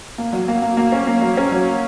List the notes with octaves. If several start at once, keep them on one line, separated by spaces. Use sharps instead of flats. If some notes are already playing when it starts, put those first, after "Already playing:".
A#3
F#3
A#3
A#3
A#3
C#4
A#3
F#3
C#4
F#3